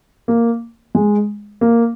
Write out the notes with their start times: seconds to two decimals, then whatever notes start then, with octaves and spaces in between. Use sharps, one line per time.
0.28 A#3
0.95 G#3
1.61 A#3